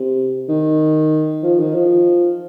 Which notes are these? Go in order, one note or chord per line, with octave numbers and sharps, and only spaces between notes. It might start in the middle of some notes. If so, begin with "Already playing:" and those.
Already playing: C3
D#3
F3
D#3
F3